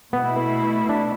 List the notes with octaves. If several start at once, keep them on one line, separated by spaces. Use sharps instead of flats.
B2 A3 B3 E4
D4